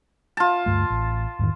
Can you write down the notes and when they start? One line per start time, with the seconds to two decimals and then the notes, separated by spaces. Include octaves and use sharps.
0.37 F4 A5
0.66 D2 G2 A3
0.90 A1
1.39 E2 G#2 D#3